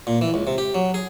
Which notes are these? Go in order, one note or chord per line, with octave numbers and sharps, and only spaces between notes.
A#2
E3
C#2
C3
G4
F#3
G#4